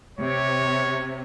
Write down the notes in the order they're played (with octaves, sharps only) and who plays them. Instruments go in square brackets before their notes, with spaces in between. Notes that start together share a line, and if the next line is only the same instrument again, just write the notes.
[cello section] C3 [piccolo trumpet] C#5